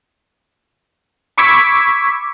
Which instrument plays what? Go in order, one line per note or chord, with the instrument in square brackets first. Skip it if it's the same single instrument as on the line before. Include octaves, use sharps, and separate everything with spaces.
[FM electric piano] B5 C#6 D6 E6 G#6 B6